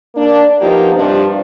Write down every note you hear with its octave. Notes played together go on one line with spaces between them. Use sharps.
A#3 D4
F3 A#3 B3 D#4 G4
G2 C3 F3 D4